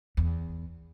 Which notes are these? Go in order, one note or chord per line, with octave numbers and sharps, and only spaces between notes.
E2